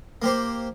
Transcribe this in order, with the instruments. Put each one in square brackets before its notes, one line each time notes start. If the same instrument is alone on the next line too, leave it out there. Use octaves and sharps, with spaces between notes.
[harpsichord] A#3 G4 C5